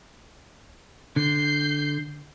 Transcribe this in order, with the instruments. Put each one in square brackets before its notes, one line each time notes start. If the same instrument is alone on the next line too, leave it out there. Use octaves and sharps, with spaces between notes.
[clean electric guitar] D3 [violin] G6 C7